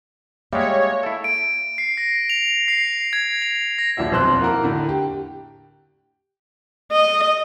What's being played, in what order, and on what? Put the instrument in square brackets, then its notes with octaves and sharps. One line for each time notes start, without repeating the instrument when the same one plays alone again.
[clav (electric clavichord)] G3 G#3 [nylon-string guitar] A#3 E5 [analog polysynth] C#5
[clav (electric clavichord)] E4 A4
[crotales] D7
C7
A#6
F7
C7
G#6
F7
A#6
[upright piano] D#1 A#1 D4 F#4 E5
B1 F2 C5 C6 F#6
A#3 E4 F#4 A#4
A2 D3
G4
[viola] D#5